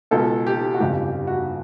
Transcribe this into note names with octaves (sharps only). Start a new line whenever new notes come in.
C#2 B2 A4
G4
F#4
G1 F2 C#3 G4
G4
F#4